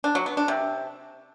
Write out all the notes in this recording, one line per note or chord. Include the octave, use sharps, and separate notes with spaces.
D4
F#3
B3
D4
C3